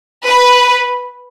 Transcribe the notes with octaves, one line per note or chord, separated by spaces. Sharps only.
B4